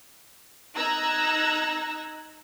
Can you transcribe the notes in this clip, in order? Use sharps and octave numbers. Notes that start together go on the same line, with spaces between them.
D#4 A#5 E6 F#6 G#6 A#6